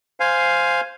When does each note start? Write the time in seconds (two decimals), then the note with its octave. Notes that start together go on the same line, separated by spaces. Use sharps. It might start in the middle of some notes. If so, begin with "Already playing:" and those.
0.20 C5 F5 G#5